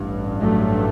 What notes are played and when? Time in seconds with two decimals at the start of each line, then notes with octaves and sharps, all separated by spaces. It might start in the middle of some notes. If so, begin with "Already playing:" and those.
Already playing: A1 G2
0.39 F#3 A3